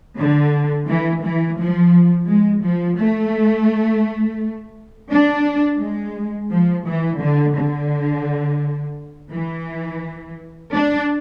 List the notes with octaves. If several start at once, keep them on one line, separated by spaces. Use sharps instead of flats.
D3
E3
E3
F3
G#3
F3
A3
D4
G#3
F3
E3
D3
D3
E3
D4